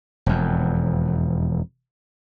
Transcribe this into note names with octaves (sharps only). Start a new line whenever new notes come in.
E1 F2